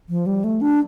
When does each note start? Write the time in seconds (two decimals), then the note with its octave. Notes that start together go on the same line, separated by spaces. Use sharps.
0.09 F3
0.26 G3
0.44 A3
0.61 D4